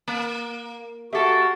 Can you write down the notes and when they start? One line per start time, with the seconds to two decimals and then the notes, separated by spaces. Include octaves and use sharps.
0.08 A#3
1.13 A#3 F#4 G4 A4 E5